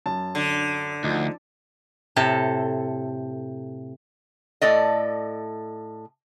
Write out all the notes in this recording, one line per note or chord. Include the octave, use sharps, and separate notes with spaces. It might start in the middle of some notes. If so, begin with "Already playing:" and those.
F#2 A5
D3
D2 F3 D#4
A2 C3 A4
A2 A4 D5 D#5